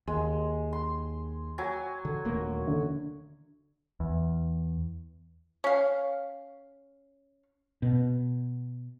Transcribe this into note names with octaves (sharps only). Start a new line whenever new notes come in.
D#2 G#3
C6
F#3 G#5
D3
D#1 D2 A#3
D3
E2
C#4 F5
B2